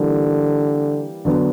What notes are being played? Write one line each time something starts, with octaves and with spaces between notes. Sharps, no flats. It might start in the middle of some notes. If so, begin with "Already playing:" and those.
Already playing: D3 E3 G3 A#3
D3 F#3 B3